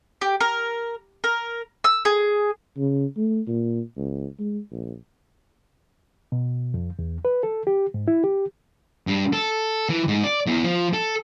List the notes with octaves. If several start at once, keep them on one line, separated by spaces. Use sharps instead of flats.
G4
A#4
A#4
E6
G#4
C#3
A3
A#2
C#2
G#3
A#1
B2
F2
E2
B4
A4
G4
G#2
E4
G4
G2
A4
E3
G#2
D5
E2
F3
A4